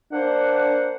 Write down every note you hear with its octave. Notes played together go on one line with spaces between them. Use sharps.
A#3 D4 C5 F#5